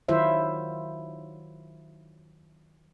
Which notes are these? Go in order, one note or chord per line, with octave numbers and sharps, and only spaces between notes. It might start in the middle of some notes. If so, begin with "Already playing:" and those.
D#3 F#3 E4 F4 C5 E5